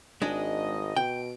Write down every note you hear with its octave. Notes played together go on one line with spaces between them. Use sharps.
G#1 G#3 D4 D#5
B2 G5 D7